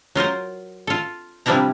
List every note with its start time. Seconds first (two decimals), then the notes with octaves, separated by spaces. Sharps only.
0.15 F#3 F4 A#4 C5
0.87 F4 A4
1.46 C3 F3 G3 D4 E4 A#5